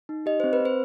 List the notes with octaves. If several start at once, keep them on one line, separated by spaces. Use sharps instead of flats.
D#4
G4 D#5
C4 C5
B4
C4 C5